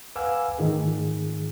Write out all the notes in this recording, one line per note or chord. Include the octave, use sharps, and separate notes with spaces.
B4 F5 F#5 G#5 D6 E6
G#2 D#3 E3 A3 F4 G#4